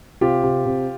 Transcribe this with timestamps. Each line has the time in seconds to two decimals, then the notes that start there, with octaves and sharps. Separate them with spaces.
0.21 C3 F4 G4
0.44 C3
0.65 C3